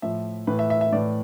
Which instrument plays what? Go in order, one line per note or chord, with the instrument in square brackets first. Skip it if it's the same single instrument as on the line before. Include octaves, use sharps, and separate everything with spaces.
[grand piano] A2 F3 E5
A2 E3 B4
E5
E5
E5
A2 E3 D5